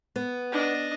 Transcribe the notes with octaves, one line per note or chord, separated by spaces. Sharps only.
B3
D4 D#5